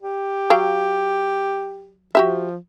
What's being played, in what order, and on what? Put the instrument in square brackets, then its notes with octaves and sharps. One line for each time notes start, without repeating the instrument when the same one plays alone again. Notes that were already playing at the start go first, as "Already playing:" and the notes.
[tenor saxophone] G4
[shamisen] F#3 F5 G5
[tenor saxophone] F3 [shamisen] F#4 G4 E5